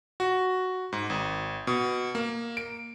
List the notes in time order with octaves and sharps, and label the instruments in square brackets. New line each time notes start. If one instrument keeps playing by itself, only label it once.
[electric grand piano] F#4
G#2
G#1
B2
A#3
D7